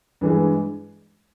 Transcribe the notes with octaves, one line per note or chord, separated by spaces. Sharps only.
G2 E3 G#3